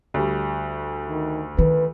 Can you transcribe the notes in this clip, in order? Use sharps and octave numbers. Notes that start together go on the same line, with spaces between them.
D2 G3
D#3
D#3 B4